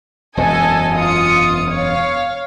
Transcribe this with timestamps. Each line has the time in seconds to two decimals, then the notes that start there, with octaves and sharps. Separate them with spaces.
0.37 E1 F#2 B2 A4 D#5 G#5
0.96 F4 D#6 C#7
1.71 C#5 F5